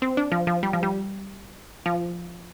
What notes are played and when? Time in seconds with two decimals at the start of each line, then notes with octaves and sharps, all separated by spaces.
0.02 C4
0.17 D4
0.32 F3
0.47 F3
0.63 G3
0.73 F3
0.83 G3
1.86 F3